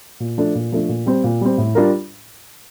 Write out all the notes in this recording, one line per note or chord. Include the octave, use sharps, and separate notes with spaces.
A#2
F3 A3 D4 A4
A#2
F3 A3 D4 A4
A#2
G3 C4
A#2
G3 C4
A2
G3 D4 F4 A#4